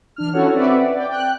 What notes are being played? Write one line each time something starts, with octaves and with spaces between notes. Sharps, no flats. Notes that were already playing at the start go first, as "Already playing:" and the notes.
E3 D4 F6
C#4 E4 F#4 A4 C#5 F#5
C4 B4 D5 E5 F#5
D5 G5
G5 F#6